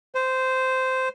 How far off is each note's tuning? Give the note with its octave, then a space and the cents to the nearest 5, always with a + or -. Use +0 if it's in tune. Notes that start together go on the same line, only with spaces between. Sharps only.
C5 -10